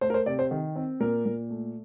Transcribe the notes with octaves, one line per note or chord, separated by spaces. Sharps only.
A3 C5
A#4
C5
C3 D5
C5
D#3
C4
A#2 A#4
A#2
A3